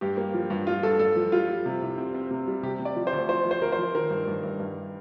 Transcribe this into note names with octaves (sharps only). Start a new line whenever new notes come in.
G2 G4
A#3
F3
G2
G2 F4
G2 A4
G2 A4
F3
G3 F4
G3
C3
C2
C4
C4
C3
G3
C3 G4
C3
D5
F3
C5
D2
F3 C5
F3
C5
D2 A#4
C5
F3
D#3 A#4
G2
G2
G2
G2